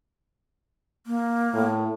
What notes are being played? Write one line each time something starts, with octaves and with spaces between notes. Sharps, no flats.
A#3
A2